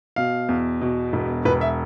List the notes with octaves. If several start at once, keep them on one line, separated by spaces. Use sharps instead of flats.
B2 F5
E2
B2
E1
E1 B4
E5